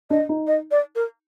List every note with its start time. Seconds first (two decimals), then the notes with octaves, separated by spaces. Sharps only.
0.10 D4 D#5
0.29 D#4
0.47 D#5
0.71 D5
0.95 A#4